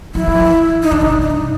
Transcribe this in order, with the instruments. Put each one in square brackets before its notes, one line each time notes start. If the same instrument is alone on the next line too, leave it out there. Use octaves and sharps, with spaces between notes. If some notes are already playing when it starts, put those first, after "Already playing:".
[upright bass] F#3 [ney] E4
[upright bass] F3
E3
[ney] D#4
[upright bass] D#3 [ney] D4
[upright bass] C#3 [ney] D#4
[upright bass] C3
[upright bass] G2 [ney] D4
[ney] D#4